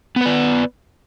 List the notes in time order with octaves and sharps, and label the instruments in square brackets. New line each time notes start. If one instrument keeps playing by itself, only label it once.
[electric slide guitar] B3
B4
D5